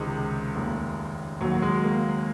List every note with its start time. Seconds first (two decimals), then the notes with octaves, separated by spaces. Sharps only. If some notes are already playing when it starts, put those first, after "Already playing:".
Already playing: C#2 C3 D#3 G#3
0.55 F1 D#2 D#3
1.41 D#2 F#3
1.45 D#3
1.51 F#3
1.62 G#3
1.83 A#3